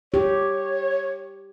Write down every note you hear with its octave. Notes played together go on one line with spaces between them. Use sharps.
G4 C#5